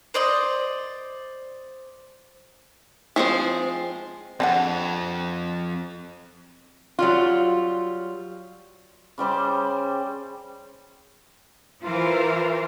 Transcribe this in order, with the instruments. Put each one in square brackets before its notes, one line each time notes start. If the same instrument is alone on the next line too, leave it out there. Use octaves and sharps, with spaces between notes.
[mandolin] C5 D5 D#5
[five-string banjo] E3 F3 G#3 C4 C5
[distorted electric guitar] F2 [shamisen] C4 D4 F#5
[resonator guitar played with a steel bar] F#3 G3 F4
[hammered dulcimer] C#3 G3 C5 D6
[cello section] E3 F4 A#4 C5